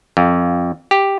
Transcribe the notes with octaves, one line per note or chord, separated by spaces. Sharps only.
F2
G4